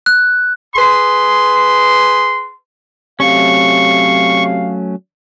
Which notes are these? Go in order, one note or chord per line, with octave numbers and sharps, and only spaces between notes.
F#6
G#4 B4 C6
C3 F#3 A3 C#4 F5 C#6